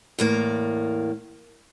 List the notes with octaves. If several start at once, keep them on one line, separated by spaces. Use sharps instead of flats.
E2 A2 A#3